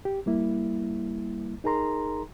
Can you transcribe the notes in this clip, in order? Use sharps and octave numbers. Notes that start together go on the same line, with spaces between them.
G4
G3 A#3 E4
D#4 G#4 A#4 A#5 C6